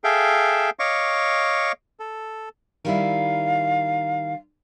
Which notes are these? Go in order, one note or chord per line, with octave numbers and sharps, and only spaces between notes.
G#4 A4 E5 F5 G5
C#5 D#5 F5 C#6 D6
A4
D#3 G3 E4 F5